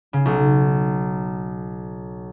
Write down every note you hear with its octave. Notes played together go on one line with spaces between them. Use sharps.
C#3
B1